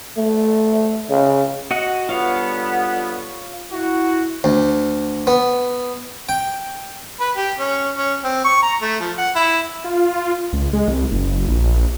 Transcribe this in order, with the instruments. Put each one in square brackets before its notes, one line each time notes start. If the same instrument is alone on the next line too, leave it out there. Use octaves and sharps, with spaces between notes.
[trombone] A3
C#3
[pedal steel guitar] F#4 D#5 F#5
[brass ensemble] D3 G3 B3 [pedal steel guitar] F4 C#5 F5
[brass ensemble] E4 F#4
[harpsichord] D2
B3
G5
[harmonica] B4
G4
C#4
C#4
C4
C#6
A#5
A3
F3
F#5
E4
[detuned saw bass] F4
C#2
G#3
C2
F#1
A#1